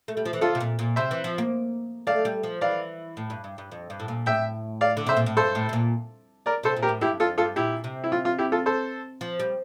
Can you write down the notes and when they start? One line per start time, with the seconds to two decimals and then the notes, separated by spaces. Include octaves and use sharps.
0.08 A3
0.17 G3
0.25 F3
0.33 E3
0.41 D3 F4 A4
0.55 C3
0.60 A#2
0.79 A#2
0.96 C3 C5 E5
1.11 E3
1.24 F3
1.38 A#3
2.07 A3 D5 F5
2.25 G3
2.43 F3
2.61 E3 D5 F5
3.17 A2
3.30 G2
3.44 G2
3.58 G2
3.72 F2
3.90 G2
4.00 A2
4.08 A#2
4.26 A2 E5 G5
4.81 D5 F5
4.97 D3
5.07 C3 C5 E5
5.17 A#2
5.26 A2
5.37 G2 A4 C5
5.55 A2
5.69 C3
5.73 A#2
6.46 A#4 D5
6.63 C3 A4 C5
6.76 A#2
6.82 G4 A#4
6.89 A2
7.01 G2 E4 G4
7.20 F2 F4 A4
7.38 G2 F4 A4
7.56 A#2 E4 G4
7.84 C3
8.04 E4
8.12 F4
8.25 F4
8.38 E4 G4
8.52 F4 A4
8.66 A4 C5
9.21 F3
9.40 G3